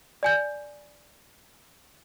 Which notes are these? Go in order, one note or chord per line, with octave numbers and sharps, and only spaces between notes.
D5 G#5 G6